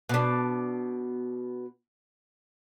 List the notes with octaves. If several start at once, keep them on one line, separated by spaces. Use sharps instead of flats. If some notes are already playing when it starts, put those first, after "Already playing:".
B2 D4